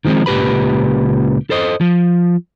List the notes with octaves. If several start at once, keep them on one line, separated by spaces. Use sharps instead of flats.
D#3 F3 G#3 C4 D#4
C#2 A#2 G4 B4 B5
A4 C5 D#5
F3